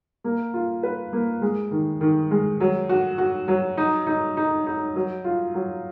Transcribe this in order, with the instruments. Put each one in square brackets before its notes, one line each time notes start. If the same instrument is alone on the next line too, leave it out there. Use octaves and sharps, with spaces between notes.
[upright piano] A#3
F4
B4
A#3
G#3
D#3
D#3
G#3
F#3
F#4
F#4
F#3
D#4
D#4
D#4
D#4
F#3
F4
F#3